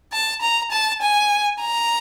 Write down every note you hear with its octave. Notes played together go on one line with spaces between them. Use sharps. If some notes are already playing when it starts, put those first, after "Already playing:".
A5
A#5
A5
G#5
A#5